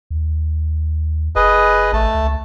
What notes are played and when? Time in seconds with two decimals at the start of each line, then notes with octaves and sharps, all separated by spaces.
0.11 D#2
1.36 F#1 G#4 B4 D#5
1.93 A1 A3 A5
2.15 C#2